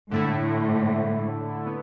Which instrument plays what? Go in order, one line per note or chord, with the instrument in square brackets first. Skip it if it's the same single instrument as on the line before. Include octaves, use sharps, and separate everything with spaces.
[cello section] A2 [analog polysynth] D3 A3 E4
[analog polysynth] B3